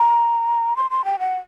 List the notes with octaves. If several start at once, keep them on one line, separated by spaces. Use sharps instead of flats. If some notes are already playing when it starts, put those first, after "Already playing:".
Already playing: A#5
C6
C6
G5
F#5